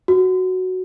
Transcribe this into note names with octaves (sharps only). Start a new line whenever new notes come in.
F#4